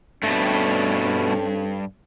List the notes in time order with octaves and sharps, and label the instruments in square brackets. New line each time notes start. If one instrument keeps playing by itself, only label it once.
[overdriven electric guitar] G2 [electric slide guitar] B2 A3 [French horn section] C4 C#4 A4